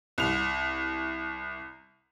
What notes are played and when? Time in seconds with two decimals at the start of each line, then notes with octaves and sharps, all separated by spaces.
0.18 C2 F7